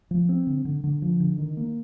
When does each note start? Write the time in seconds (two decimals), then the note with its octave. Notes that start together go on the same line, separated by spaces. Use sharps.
0.11 F3
0.29 C4
0.47 D3
0.65 D3
0.84 D3
1.02 F3
1.20 D3
1.38 D#3
1.57 A#3